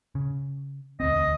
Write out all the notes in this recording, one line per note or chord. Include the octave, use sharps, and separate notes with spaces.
C#3
E1 D2 C4 D#5